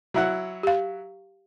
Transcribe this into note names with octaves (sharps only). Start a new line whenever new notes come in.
F#3 E4 F#5
G4 F5